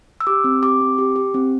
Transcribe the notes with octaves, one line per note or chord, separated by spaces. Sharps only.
E6
G4 D6
C4
G4 D6
C4
G4
G4
C4